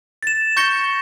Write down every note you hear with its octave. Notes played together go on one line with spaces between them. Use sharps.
A6 E7
C#6 G6 A#6 C#7 G7